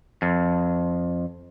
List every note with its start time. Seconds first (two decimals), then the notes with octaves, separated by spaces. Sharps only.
0.22 F2